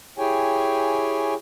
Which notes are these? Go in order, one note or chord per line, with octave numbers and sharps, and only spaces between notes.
E4 G4 G#4 C#5 G5 G#5